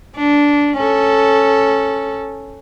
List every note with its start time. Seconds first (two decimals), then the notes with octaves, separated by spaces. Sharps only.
0.16 D4
0.78 C#4 A4